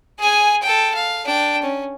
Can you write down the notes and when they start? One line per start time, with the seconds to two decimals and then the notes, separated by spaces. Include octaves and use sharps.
0.19 G#4 G#5
0.62 A4 G5
0.95 F5
1.26 D4 G5
1.62 C#4